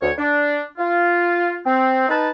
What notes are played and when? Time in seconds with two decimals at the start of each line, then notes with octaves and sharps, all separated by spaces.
0.01 D2 C#5
0.18 D4
0.78 F4
1.64 C4
2.09 D#4 B4 A5